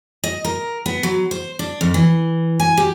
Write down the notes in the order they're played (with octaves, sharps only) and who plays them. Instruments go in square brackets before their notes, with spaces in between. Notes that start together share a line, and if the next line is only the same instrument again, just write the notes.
[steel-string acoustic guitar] D#5
A#4
B3
F#3
C5
D4
F2
E3
G#5
G4